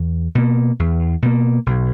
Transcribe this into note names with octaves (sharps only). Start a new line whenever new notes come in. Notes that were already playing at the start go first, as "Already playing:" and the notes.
Already playing: E2
B2 A#3
E2
B2 A#3
B1